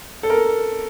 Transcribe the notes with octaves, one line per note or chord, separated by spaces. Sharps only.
A4
A#4